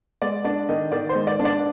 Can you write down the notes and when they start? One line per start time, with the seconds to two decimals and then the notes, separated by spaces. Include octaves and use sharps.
0.22 G#3 D5
0.44 D4 D5
0.69 D#3 D#5
0.92 D#3 D5
1.09 C5
1.15 G#3
1.27 D5
1.40 D4
1.45 D5